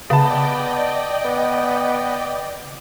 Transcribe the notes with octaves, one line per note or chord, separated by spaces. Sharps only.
C#3 B3 D5 D#5 G5 A5 B5
B3